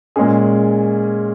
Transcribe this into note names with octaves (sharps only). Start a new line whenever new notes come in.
A#2 G#3 C#4 G#4